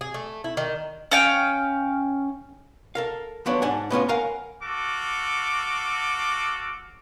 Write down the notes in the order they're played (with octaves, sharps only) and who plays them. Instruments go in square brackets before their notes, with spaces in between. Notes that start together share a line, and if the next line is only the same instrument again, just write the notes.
[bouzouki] G#4
A3
E4
D#3
[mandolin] C#4 F5 G5
[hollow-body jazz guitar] A4 A#4 F5
F3 F#3 B3 D4 C#5 D5
G#2 D4 D5 F#5 G#5
A2 B3 C#4 F4
A#4 F5 F#5 G#5 A#5
[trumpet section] F#4 A4 F5 D6